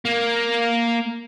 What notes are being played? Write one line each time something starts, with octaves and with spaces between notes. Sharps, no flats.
A#3